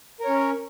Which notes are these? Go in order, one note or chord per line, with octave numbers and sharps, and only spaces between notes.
C#4 A#4 C#5